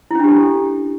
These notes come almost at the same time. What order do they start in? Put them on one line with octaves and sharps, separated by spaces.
E4 C#4 D4 G4 A4